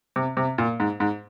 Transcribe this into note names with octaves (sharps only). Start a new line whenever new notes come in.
C3
C3
A#2
G#2
G#2